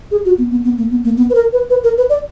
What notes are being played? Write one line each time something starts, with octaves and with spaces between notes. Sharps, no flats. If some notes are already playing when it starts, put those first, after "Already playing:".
G#4
F#4
B3
B3
B3
A#3
B3
A#3
B3
B4
A#4
B4
B4
A#4
B4
D5